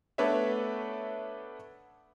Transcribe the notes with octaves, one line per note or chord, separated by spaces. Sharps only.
A3 B3 D4 B4 C#5 E5